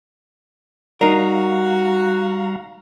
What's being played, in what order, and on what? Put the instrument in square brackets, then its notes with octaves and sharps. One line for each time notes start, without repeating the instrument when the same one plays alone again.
[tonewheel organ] G3 F5 A#5 [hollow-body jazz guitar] D#4 A#4 [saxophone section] F#4